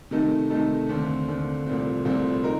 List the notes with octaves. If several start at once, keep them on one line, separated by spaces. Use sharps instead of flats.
C3 D#3 A3 D#4 A4
C3 D#3 A3 D#4 A4
D#2 D3 A3 C4
D#2 D3 A3 C4
C2 A#2 A3 C4
C2 A#2 A3 C4
D#4 A#4